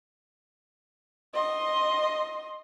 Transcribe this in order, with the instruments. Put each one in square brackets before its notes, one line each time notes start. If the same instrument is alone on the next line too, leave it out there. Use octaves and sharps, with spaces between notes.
[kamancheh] D#5 C6